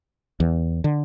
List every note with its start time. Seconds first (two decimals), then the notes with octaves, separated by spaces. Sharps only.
0.40 E2
0.84 D3